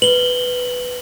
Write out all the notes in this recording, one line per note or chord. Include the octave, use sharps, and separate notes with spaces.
B4 F#7 G7